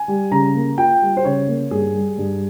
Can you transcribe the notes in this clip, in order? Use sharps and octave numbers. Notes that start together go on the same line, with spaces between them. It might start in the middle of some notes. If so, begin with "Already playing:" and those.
Already playing: G#5
G3
C#3 A#5
A#3
F4 G5
G3
C5
C#3 C#5
A#3
G2 G#4
G3
G2